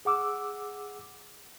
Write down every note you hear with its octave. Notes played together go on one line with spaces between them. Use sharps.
G#4 F#5 D6 E6